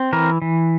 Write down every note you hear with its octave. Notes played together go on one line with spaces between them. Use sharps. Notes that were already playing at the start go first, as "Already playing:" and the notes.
Already playing: C4
E3 A#4
E3